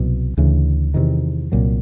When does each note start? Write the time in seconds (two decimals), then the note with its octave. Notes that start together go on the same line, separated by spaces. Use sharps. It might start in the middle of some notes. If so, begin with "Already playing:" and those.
Already playing: C2 B2 F#3
0.37 D2 C#3 E3
0.94 E2 C3 D#3
1.52 C2 A#2 F#3